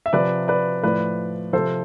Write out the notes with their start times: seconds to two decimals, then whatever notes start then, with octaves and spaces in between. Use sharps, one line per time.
0.06 E5
0.13 C3 F3 B4 D5
0.48 B4 D5
0.83 A2 F3 B4 D5
1.53 C3 F3 A4 C5